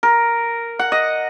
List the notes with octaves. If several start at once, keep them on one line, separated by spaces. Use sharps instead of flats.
A#4
F#5
D#5